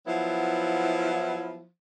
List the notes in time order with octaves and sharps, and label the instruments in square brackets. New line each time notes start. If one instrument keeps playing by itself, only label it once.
[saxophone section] F3 F#3 B3 E4